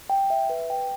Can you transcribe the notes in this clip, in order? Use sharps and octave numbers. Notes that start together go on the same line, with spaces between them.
G5
E5
B4
G5